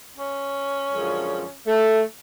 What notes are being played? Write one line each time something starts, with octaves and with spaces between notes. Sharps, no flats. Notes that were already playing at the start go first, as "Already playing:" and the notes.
C#4
F#2 D3 F3 G#3
A3